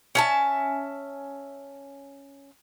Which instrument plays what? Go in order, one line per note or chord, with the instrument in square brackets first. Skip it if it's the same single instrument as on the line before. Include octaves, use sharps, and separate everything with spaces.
[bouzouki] C#4 E5 A5